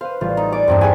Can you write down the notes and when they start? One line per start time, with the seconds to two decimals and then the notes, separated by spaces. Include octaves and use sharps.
0.01 B4 C5 F5
0.21 A1 G3 F4
0.37 D#4
0.52 D5 G#5 D6
0.68 E2 G2 C4 D4 D#4 A4
0.81 D4 G4 G#4 B4 F#5 G#5